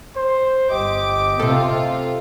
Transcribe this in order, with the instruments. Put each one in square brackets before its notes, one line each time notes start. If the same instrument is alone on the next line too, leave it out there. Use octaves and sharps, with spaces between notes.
[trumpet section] C5
[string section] G1 D6 [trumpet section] G4 D#5
[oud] C3 A4 [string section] C4 F4